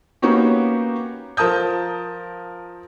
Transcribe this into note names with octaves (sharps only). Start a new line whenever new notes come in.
A#3 B3 C#4 D#4 F#4 G4
F3 A#4 A5 D#6 G6